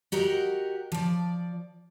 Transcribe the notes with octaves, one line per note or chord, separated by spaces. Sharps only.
F#4 G4 A#4 D#5 F#5
F3 D5